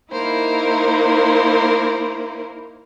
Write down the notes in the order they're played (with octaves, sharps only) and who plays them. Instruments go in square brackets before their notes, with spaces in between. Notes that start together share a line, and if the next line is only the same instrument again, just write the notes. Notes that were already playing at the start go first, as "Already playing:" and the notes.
[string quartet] A#3 D#4 E4 A#4 C5